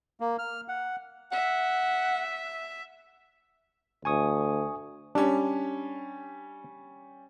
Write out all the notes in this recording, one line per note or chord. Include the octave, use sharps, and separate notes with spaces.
A#3
F6
F#5
E5 F#5
D2 G#5 C#6 D#6
G3 C#4 D4